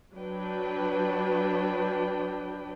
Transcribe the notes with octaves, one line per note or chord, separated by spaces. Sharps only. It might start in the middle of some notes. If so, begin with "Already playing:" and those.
F#3 D4 B4 G5